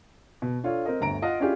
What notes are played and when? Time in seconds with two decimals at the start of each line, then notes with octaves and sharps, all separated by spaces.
0.42 B2
0.64 D4 F4 A4 C#5
0.85 C4 A#4 D#5
1.00 G1 D2 A#5 D7
1.22 F4 D#5 F5 F#5
1.40 C#4 D4 E4 F4 G4 G#4